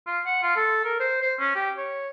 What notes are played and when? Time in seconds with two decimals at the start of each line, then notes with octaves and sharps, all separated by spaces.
0.07 F4
0.26 F#5
0.43 F4
0.56 A4
0.85 A#4
1.00 C5
1.22 C5
1.39 C#4
1.55 G4
1.77 C#5